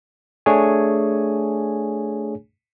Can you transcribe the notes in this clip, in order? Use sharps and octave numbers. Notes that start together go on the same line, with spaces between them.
A3 D4 G#4 C#5 G#5